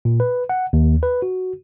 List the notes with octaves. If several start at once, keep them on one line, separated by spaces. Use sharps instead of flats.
A#2
B4
F#5
D#2
B4
F#4